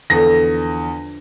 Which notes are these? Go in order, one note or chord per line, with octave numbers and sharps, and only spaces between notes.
E2 D3 F3 A#6